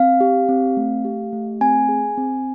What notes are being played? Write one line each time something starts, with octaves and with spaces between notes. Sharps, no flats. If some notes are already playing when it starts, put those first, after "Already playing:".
Already playing: C4 F5
G4
C4
A3
G4
A3
C4 G#5
G#4
C4